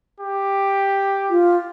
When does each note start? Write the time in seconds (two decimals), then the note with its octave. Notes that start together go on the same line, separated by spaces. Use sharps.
0.20 G4
1.30 F4